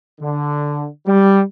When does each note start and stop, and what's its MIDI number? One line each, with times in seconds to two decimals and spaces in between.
0.21 0.87 50
1.06 1.41 55